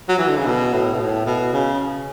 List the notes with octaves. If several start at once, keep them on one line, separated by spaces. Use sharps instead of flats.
F#3
E3
D3
C#3
B2
A2
B2
A2
B2
C#3